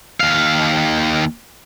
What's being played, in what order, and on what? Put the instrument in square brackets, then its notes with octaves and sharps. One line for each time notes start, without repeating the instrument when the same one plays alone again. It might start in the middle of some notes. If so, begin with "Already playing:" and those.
[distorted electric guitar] D#2 F5